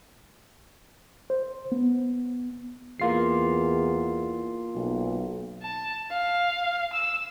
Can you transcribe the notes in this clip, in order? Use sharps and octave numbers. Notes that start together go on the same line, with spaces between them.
C5
B3
E2 A#3 F4 C7
B1
A5
F5
E6